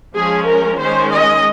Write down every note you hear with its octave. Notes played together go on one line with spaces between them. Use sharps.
F3 G#3 C#4 G#4
A#4
D#3 G#3 C#4 C5
D#5